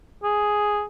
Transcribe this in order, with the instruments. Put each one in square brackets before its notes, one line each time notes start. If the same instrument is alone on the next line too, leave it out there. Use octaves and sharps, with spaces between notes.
[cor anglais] G#4